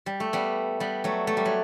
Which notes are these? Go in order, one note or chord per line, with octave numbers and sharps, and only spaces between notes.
G3
A3
G3 B3
G3 B3
F#3 A3
A3
G3
F#3